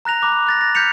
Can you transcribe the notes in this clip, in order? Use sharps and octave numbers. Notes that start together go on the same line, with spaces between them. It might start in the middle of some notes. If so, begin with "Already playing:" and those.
A#5 F#6 A#6 F7
A#5 B5 D6 F#6
F#6 A6 A#6
A#6
F6 G6 B6 C#7 F7